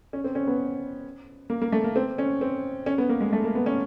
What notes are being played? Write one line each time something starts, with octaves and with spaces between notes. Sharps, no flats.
C#4
C4
C#4
B3
A#3
A#3
A3
A#3
C4
C#4
C4
C#4
B3
A#3
G#3
A3
A#3
B3
C#4